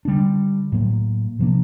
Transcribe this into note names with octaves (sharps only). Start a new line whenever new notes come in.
D3 G3 B3 D4
A2 F#3 A#3
C3 F3 A#3 D4